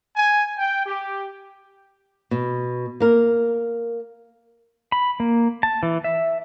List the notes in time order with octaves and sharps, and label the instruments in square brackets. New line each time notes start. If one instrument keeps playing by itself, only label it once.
[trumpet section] G#5
G5
G4
[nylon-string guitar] B2
A#3 A#4
[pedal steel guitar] B5
A#3
A5
E3
E5